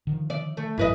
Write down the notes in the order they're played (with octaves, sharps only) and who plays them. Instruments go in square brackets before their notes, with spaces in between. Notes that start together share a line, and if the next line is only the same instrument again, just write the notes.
[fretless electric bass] D3 D#3 F3
[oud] D5
A3
[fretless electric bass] A1 G2 F#3 [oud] E3 B4 D#5